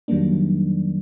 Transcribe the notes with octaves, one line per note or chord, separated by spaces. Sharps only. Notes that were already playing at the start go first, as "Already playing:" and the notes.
F2 D#3 F#3 G3 A#3 D4